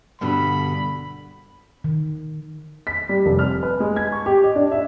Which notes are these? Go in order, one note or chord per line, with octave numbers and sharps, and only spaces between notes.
G2 B2 D3 B5
D#3
B6
G3
F1
F6
B4
G#3
G#6
C#6
G4
D#5
D4
E5